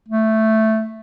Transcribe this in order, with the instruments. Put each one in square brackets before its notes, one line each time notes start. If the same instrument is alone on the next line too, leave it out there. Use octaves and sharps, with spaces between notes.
[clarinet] A3